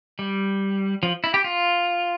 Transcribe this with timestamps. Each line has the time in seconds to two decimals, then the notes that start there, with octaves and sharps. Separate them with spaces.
0.19 G3
1.03 F3
1.24 E4
1.34 G4
1.44 F4